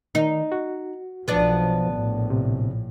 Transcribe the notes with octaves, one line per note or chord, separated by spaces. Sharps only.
D#3 D#4
F#4
B1 F3 B3 D4
A#1 A2
C3